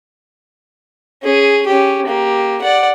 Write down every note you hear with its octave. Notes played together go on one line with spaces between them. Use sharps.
C#4 G#4
C#4 G4
A#3 G4
D5 F#5